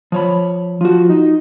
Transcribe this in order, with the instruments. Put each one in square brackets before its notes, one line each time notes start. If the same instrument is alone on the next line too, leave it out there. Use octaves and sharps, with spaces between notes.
[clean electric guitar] F3 C#5 B5
[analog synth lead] F3 [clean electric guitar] F4 F#4
[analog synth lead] D#4